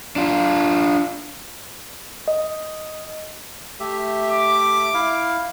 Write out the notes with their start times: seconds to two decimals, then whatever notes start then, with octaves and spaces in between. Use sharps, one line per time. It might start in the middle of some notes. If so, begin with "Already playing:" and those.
0.16 D4 F4
2.28 D#5
3.80 A3 G4 E5
4.31 D6
4.94 E4 F5